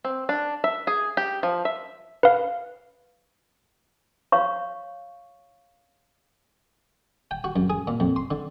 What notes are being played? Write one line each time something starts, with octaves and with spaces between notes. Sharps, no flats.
C4
D4
E5
G#4
G4
F3
E5
B4 F5
C#5 F5 C#6
G5
F#4
F#2
G#4
A#2
F2
C6
D3